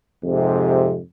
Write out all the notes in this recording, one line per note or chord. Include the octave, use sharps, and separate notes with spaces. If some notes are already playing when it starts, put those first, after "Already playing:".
F2 G#2 C3